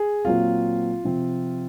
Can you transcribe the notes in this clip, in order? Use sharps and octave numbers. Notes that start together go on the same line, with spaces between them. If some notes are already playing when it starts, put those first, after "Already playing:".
Already playing: G#4
A#2 F#3 C4 F4
C3 F3 C4